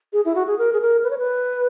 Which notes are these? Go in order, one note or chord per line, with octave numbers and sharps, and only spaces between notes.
G#4
E4
F#4
G#4
A#4
G#4
A#4
B4
C#5
B4